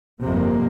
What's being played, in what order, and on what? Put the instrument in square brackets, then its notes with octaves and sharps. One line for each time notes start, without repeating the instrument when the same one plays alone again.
[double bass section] G1 F2 C3 A#3